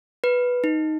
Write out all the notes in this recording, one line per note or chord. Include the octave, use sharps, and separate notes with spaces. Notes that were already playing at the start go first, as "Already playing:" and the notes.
B4
D#4